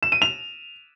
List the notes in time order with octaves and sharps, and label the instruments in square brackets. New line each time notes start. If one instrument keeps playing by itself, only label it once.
[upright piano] E7
D#7
F7